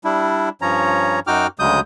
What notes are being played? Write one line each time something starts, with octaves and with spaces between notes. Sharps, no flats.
G3 D4 E4
G2 F3 C#4 C#5 A#5
F#2 D#4 F#4 G5 D6 F6
D2 C#3 F#3 G#3 D#6 G6